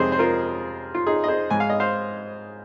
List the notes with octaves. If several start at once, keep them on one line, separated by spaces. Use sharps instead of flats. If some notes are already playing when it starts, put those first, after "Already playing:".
Already playing: F2 C3 G#3 G#4 C5 D#5
C5
F4 A#4
F4
D#4 G#4
D#5
G#4 C5
G#2 G#3 G#5
F5
D#5
C5 F5